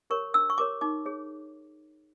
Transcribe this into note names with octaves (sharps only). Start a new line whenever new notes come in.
G4 A#4 C#5 C#6
D4 E6
C#6
G4 A#4 C#5 D6
D#4 D6
G#4 C#5